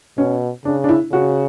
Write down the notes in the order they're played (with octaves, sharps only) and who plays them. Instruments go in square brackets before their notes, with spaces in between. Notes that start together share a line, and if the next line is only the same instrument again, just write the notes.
[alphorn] B2 [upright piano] C#4
[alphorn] C#3 [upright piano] D4
[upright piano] D4
E4
[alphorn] C#3 [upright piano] F#4